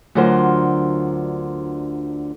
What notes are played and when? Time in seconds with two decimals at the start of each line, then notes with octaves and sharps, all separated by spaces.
0.15 D2 D3 F#3 F4 A#4 C5